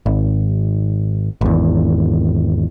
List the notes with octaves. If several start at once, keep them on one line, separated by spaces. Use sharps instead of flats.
G#1
G#1 E2